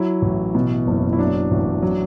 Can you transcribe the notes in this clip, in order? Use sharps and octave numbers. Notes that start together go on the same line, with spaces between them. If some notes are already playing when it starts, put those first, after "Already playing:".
Already playing: F#3 E4
A1
B2
F#1
E4
F#3 D4
A1
F#3